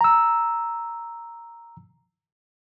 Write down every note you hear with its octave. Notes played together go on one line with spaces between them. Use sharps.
A#5 E6